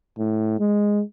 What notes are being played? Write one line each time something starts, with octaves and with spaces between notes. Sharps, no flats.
A2
G#3